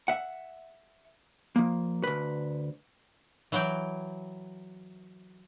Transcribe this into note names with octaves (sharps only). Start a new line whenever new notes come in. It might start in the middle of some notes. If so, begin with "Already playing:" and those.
E5 F#5
F3 A#3
D2 B4
E3 F#3 G5